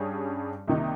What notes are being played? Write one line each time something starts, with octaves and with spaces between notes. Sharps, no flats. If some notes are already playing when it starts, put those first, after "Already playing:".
Already playing: G2 G3 C#4 G#4
C2 C3 D#3 A#3 D#4